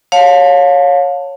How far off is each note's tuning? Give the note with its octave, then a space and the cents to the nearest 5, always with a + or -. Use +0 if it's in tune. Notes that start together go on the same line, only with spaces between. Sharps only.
C#5 +0 F5 +25 A5 +15